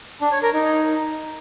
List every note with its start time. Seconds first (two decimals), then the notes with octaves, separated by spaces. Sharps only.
0.21 D4
0.32 C#5
0.43 A#4
0.53 D#4